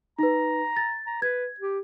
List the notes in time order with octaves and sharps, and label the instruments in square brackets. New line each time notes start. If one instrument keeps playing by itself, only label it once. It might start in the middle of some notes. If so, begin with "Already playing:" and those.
[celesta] D#4 B4 [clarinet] A#5
[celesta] A6
[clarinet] A#5
[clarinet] B4 [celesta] G#6
[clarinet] G4